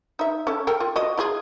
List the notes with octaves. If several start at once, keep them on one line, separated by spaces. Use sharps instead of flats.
D#4 E5
C#4 A4
A4 A#4 G5
F4
F#4 D#5
E4 F4 G#4